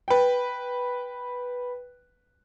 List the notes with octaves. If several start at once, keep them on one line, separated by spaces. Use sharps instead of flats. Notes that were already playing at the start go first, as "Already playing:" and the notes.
B4 G5